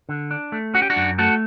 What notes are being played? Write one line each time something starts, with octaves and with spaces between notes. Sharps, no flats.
D3
D4
A3
C#4 F#4
G4
D4 F#4
F#2
A3 F#4 A4